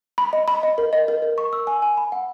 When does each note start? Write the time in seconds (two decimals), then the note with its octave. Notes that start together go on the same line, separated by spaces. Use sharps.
0.18 B5
0.33 D#5
0.48 B5
0.63 D#5
0.78 A#4
0.93 D#5
1.08 A#4
1.22 A#4
1.38 C#6
1.53 E6
1.67 G#5
1.82 G#5
1.97 B5
2.12 F#5